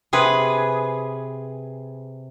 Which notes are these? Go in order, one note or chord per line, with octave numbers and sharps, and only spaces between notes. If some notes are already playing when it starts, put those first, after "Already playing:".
C3 G#4 B4